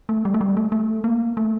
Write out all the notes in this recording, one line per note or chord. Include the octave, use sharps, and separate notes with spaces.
A3
G3
A3
G3
A3
A3
A#3
A3